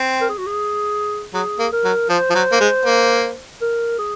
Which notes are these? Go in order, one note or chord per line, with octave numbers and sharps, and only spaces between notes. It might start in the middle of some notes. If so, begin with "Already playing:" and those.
Already playing: C4
A#4
G#4
F#4
G#4
F#3 G#4
A#3
A#4
F#3
F3 C5
F3
F#3
A#3
G#3
A#3
A#4
G#4